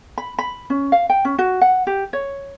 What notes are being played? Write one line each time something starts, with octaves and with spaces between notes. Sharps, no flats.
B5
B5
C#4
F5
G5
C#4
F#4
F#5
G4
C#5